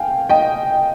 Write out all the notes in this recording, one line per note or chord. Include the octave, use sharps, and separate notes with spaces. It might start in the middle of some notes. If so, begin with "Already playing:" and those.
Already playing: F5 G5 G#5
D#5 G5